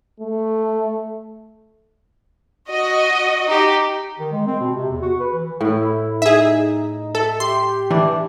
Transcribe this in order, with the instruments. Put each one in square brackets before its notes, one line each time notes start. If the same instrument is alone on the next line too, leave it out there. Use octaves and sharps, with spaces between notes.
[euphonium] A3
[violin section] F#4 D#5
[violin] D#4 G4
[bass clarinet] D#3
G#3
C4
B2
C3
E2
F#4
B4
E3
[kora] A2 [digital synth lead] E4
[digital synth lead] D#4 [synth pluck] G#4 E5
[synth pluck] A4 [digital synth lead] E5
[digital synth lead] G4 [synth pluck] C6
[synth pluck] E3 [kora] D4